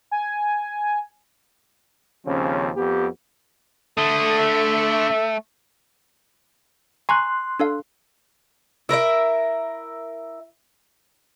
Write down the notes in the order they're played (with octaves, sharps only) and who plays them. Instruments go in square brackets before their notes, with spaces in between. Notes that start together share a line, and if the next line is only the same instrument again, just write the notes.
[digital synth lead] G#5
[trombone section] D#2 C#3 F3 C4 C#4
F2 B3 G4
[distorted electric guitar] D3 [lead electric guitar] A3 [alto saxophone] A4 [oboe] D#6
[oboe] E5
[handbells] G#5 A#5 C#6 [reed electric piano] C6 F#6
[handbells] D4 A4 F5
[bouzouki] E4 A#4 B4 E5